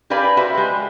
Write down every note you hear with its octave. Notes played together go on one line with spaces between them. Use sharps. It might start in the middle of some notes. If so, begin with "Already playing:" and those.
G4 A#4 B4 D5 F5 G#5
F#4 B4 C5 E5
G#3 G4